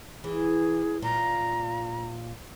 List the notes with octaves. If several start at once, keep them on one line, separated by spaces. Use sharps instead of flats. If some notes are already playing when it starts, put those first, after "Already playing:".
E3 G#4
A#2 F4 A#5